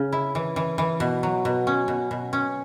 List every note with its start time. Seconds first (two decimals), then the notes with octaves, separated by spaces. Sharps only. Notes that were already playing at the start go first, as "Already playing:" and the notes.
Already playing: C#3
0.13 E4
0.35 E3
0.56 E3
0.78 E3
1.00 B2
1.23 F#3
1.45 B2
1.67 C#4
1.88 B2
2.11 B2
2.33 C#4